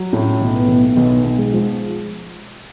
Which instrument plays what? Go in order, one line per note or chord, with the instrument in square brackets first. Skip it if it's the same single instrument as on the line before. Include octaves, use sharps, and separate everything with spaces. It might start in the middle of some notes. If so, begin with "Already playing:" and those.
Already playing: [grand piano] F#3
[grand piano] A2 [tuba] C#4
[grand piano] B1
[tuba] B3
[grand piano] B1
[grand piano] B1 [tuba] B3
[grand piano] B1
[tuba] G#3
[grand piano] F3